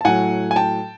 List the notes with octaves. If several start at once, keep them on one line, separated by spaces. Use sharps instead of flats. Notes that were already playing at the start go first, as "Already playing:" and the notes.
A5
A2 F#3 F#5 G#5
G#5
G5 A5